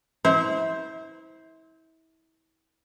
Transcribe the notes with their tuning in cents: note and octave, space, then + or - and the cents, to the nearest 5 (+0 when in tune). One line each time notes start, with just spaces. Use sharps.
E4 -30 C5 +0